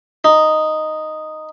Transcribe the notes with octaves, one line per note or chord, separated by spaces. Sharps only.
D#4